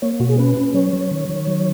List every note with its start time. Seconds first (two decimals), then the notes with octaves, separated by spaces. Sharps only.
0.02 A#3 C#5
0.20 B2 F#4
0.29 G#4
0.38 C#4 B4
0.57 C#4
0.74 F#3 C#5
0.93 F#3
1.11 D#3
1.29 D#3
1.47 F#3